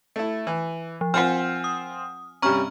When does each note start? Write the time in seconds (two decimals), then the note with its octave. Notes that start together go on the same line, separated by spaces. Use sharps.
0.16 A3 E4
0.47 E3
1.01 F3
1.14 C4 F4 C5 F#5 G#5 F6
1.64 D#6
2.42 G2 C3 C#4 A#5 C#6 F6